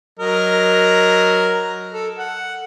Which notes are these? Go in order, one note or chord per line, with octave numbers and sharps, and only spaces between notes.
F#3 A#4 D#5
A4
F#5